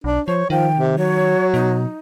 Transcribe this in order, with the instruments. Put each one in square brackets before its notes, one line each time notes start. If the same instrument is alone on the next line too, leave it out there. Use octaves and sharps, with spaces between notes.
[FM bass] B1 [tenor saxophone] D4
[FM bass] F3 [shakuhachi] C5 [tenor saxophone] C#5
[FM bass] D#3 [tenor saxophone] F3 [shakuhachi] G5
[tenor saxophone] C3
[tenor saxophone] F#3 [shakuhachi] C#5
[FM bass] B2 [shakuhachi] D#4